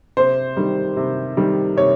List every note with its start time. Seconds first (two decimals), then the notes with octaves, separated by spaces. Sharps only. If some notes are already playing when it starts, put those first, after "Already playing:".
0.17 C3 C5
0.57 D#3 G3
0.97 C3
1.37 D#3 G3
1.77 C3 C#5